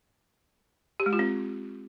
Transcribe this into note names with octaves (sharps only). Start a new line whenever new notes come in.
G4
G#3
F4
C4